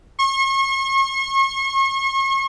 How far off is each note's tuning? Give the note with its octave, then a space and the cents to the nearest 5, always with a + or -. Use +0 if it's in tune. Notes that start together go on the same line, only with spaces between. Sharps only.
C#6 -40